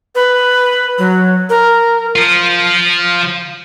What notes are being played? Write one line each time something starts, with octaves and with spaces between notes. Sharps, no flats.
B4
F#3
A#4
F3 F4